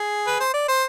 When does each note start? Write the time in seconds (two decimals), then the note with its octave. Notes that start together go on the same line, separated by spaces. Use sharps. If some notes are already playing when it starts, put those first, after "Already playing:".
Already playing: G#4
0.27 B4
0.40 C5
0.54 D5
0.68 C5